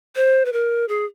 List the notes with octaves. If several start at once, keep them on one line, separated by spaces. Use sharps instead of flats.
C5
B4
A#4
G#4